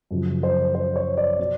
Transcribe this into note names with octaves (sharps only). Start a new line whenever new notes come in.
F#2 C#3 F3
C5
C5
C#5
D5
B2